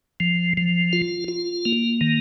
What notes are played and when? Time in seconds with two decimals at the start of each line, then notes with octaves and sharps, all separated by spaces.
0.20 F3
0.57 F3
0.93 F4
1.28 F4
1.65 A#3
2.01 D#3